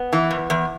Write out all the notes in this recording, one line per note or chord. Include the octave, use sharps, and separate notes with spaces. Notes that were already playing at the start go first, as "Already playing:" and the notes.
Already playing: B3
E3
E2
E2